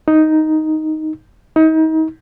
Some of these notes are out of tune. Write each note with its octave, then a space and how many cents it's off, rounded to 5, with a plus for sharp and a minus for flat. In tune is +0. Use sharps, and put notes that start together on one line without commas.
D#4 +5
D#4 +35